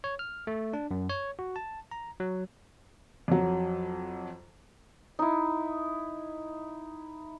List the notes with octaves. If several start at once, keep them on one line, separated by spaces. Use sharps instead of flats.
C#5
F6
A3
D4
F#2
C#5
F#4
A5
A#5
F#3
F2 F#3
D#4 E4